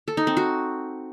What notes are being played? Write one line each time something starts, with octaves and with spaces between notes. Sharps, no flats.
A4
D#4
C4
F#4